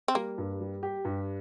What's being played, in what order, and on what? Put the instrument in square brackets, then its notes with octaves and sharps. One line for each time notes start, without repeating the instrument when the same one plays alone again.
[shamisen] C4
[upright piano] G3 [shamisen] A#3
[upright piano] G2
G3
G4
G2